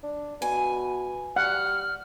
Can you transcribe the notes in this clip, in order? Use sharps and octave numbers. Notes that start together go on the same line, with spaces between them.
D4
B2 G#5
G3 F#5 F6